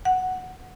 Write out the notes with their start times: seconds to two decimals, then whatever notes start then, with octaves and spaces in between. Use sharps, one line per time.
0.05 F#5